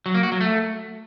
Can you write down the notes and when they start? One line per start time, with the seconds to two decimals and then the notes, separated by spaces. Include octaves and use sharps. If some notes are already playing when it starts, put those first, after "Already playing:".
0.06 F#3
0.14 A#3
0.23 F#4
0.32 F#3
0.40 A3